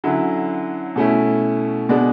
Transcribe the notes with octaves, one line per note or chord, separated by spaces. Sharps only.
D3 F#3 C#4 E4
B2 A3 C#4 E4
B2 G#3 B3 D4